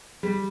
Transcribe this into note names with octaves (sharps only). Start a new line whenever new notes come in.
G3